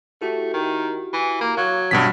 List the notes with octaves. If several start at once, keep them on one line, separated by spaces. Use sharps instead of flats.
A3 E4 F#4 G4
D#3
E3
A#3
F#3 F5 F#5
G2 B2 E3 C4 B6